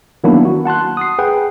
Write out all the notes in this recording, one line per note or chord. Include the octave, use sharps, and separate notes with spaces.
D#3 F#3 A#3 B3 D4 E4
F#4
F#5 A5 C6 F#6
D#6 C7
G#4 B4 F#5 G5